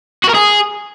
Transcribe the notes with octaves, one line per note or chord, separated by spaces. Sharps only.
F#4
A#4
G#4